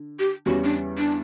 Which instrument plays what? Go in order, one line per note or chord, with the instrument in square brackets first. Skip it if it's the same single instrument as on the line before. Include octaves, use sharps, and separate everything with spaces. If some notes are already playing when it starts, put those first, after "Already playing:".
Already playing: [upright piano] D3
[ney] G4
[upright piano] E2 C#3 G3 C#4 [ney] F#4
[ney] D4
D4